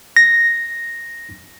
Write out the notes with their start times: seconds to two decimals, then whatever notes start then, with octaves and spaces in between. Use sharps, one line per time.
0.16 A#6